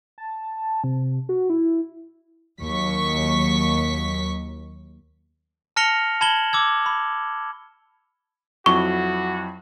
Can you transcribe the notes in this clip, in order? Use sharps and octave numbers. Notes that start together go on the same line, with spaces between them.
A5
C3
F#4
E4
D#2 F#3 C#6 B6
A5 F6 A#6 C#7 F7 G7
A5 B5 G#6 E7 F#7 G7
D6 E6 G#6
B5
F2 F#3 E4 F#4 C#6